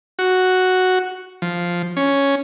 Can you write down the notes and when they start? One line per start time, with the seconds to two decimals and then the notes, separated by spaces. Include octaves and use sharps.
0.19 F#4
1.42 F3
1.97 C#4